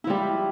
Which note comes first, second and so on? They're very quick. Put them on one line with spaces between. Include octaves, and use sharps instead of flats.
E4 F3 G3